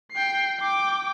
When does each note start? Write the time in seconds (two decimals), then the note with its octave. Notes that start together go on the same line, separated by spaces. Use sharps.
0.12 G5 C7
0.60 G5 D6